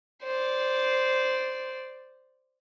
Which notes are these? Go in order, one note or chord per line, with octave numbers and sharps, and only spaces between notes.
C5 D5